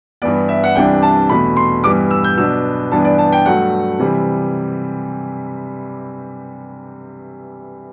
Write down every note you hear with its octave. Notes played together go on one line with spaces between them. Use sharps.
G2 E3 B3 D5
E5
F#5
C2 C3 E3 G3 D4 G5
A5
E2 B2 A3 B5
C6
G2 E3 G3 B3 D6
E6
G6
B2 F#3 B3 D4 E6
G2 E3 B3 D4 A5
D5
A5
G5
G2 F#3 A3 F#5
C3 E3 G3